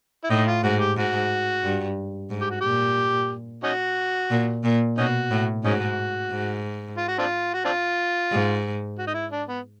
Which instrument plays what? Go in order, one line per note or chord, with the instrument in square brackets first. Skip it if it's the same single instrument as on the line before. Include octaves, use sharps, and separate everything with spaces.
[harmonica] E4
[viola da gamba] A2 [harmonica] D#4
[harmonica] F4
[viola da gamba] G#2 [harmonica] F#4
[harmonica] G4
[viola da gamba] G#2 [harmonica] F#4
[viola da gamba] G2
G#2
[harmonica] G4
F#4
[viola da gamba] A#2 [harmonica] G4
[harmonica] C#4 D#4 F#4
[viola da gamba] A#2
A#2
[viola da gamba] B2 [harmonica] C#4 D#4 F#4
[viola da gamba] A2
[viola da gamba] G#2 [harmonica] C#4 D#4 F#4
[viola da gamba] G#2
[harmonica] F4
F#4
C4 D4 F4
F#4
C4 D4 F4
[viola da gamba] G#2
[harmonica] F#4
D#4
E4
D4
B3